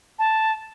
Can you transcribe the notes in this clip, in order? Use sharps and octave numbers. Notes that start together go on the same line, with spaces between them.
A5